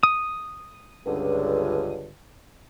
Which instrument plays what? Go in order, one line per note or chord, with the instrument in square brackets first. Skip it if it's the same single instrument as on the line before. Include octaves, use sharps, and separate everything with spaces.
[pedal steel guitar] D#6
[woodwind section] C#2 G2 D3